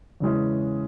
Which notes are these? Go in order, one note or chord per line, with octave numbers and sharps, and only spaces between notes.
E2 C#3 E3 G#3 C#4